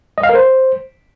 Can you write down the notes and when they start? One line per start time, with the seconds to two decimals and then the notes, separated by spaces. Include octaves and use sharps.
0.18 D#5
0.23 F5
0.29 A#4
0.35 C5